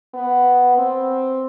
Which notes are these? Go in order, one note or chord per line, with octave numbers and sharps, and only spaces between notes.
B3
C4